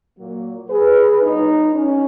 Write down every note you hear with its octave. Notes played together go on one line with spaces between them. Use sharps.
A#2 F#3 A#3
G#4 B4
A#2 F#3 B3 D#4
C#4